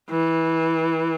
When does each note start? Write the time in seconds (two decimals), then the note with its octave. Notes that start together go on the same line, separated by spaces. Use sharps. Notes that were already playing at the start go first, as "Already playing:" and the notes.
0.10 E3